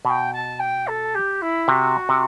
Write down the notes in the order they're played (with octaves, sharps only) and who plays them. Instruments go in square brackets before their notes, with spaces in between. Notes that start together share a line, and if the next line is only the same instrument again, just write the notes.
[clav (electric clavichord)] B2 [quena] A5
[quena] G5
A5
G5
A4
G4
E4
[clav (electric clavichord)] C3 [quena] F#4
[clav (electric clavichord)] C3